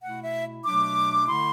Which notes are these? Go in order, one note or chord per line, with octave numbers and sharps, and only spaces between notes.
B2 A3 E4 F#5
E5
B2 F#3 A3 D4 D6
D3 A3 E4 C6